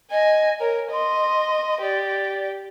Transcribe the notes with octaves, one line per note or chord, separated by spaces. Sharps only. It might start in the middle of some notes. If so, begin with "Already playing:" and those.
D#5 G#5
A#4 C#5
D#5 C6
G4 D5